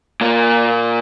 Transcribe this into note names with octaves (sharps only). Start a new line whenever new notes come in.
A#2 A#3